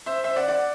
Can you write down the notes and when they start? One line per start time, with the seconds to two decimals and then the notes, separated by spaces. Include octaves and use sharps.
0.06 C5 E5
0.24 C5 E5
0.36 D5 F#5
0.48 D5 F#5